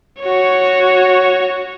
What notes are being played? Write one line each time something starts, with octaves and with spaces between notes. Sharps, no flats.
F#4 C#5